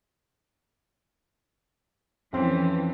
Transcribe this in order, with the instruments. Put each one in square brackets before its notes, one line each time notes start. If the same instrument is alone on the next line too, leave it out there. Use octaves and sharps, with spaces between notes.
[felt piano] F2 C4 C#4 [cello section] E3